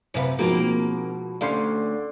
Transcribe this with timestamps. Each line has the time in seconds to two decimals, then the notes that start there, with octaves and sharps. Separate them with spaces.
0.14 F#2 C3 C4 B4 F5
0.39 G#2 B2 F3 A#3 C4
1.41 D2 D3 C#4 G4 F5 C6 C7